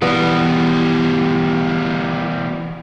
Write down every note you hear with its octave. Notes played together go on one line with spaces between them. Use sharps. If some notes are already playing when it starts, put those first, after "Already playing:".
B2 E3 G3 B3 D5